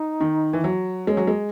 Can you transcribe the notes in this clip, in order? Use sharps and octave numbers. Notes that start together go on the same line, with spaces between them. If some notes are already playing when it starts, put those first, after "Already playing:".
Already playing: D#4
D#3
E3
F#3
G#3 C#4
F#3
G#3